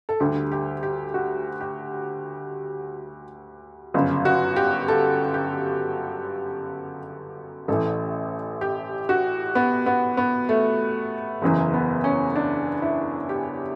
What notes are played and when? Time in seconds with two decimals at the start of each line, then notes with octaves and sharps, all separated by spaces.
0.09 A4
0.20 D2 D3 G3 G4
0.52 G4
0.83 G4
1.14 F#4
1.60 G4
3.94 G1 F#2 C#3
4.25 F#4
4.56 G4
4.88 A4
5.34 G4
7.68 A1 A2 E3 A4
8.61 G4
9.09 F#4
9.55 B3
9.86 B3
10.17 B3
10.49 A3
11.42 F#1 E2 C#3 E3
11.74 B3
12.04 C#4
12.36 D4
12.82 E4
13.29 G4